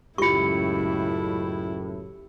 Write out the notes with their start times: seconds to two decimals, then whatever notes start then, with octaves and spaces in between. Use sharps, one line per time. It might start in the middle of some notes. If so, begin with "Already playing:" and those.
0.18 C#2 F#2 A2 E4 F4 G4 C#6 C#7